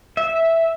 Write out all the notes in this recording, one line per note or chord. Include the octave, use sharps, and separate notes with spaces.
E5